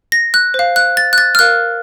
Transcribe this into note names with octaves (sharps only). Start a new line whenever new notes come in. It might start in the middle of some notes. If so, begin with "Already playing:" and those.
A#6
F#6
C5 F5
F#6
A6
F#6
A6
F6
A#4 F5 F#6